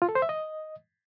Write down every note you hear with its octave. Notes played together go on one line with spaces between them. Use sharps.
F4
A4
C5
E5
D#5